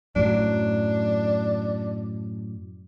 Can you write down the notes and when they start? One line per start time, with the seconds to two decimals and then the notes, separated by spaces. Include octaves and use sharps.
0.16 F#2 A2 F#3 D4